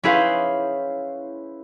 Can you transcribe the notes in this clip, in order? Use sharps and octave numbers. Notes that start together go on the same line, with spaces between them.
C#4 E4 G#4 B4 C5 F5